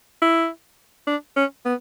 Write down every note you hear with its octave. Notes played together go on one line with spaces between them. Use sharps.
E4
D4
C#4
B3